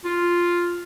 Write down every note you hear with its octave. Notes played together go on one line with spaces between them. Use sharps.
F4